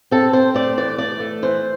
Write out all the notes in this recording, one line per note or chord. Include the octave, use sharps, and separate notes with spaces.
C4 A4
C4 C5
A3 D5
E3 D5
A3 D5
A3
E3 C5